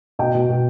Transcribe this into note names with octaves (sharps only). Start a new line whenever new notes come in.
B2 D#5 G5
B2
B2